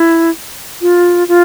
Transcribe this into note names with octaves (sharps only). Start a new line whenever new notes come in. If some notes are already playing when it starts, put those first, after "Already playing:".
Already playing: E4
F4
F4